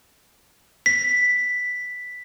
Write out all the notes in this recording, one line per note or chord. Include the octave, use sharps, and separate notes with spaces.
B6